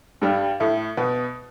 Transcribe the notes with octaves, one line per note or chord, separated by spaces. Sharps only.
G2 G3
A2 A3
B2 B3